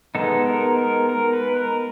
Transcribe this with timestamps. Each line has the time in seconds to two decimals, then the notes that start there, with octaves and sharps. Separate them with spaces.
0.15 G#3 B3 D#4 A4
0.46 A#4
0.79 A#4
1.09 A#4
1.33 B4
1.57 A#4